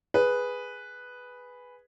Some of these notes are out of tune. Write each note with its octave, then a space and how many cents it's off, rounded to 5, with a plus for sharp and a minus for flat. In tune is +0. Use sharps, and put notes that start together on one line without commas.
G#4 +0 B4 +0